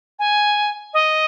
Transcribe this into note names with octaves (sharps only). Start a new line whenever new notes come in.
G#5
D#5